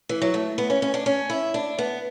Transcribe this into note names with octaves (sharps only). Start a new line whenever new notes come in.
E3
F#3
A3
B3
C#4
C#4
D4
C#4
E4
D4
B3